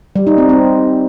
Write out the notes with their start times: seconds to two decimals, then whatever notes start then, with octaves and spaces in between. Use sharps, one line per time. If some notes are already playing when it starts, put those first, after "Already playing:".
0.16 G3
0.27 D#4
0.38 C4
0.49 C4